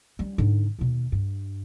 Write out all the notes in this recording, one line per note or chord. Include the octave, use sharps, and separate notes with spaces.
G3 C#4
G#2 D3
D#2 B2
G2